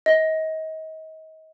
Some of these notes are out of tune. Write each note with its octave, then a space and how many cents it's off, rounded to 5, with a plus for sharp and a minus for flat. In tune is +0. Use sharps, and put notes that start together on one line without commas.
D#5 +30